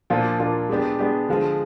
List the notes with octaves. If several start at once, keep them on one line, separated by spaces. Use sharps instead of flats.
A#2 F3 A#3 D4 F4
A#2 F3 A#3 D4 F4
G#3 B3 D4 G4
G#3 B3 D4 G4
D3 F3 G#3